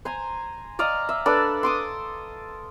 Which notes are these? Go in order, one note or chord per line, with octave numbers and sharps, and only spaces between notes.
C5 G#5 A#5
D5 D#5 F5 A#5
E5
D4 A4 B4 D5
C6 D6 D#6